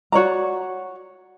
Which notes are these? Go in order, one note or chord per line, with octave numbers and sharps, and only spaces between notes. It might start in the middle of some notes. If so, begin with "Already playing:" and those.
F#4 C#5 D5 A#5